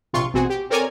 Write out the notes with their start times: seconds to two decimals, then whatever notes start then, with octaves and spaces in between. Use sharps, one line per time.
0.13 A#1 C3 F4 C6 C#6
0.33 A1 B2 C4 F#4 G#4
0.50 G4
0.70 C4 A4 A#4 C#5 D5 G#5